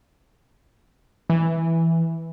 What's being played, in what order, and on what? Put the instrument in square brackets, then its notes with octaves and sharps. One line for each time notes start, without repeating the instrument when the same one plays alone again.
[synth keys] E3